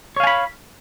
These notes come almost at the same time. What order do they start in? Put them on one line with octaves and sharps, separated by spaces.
C#5 F5 G#5 B5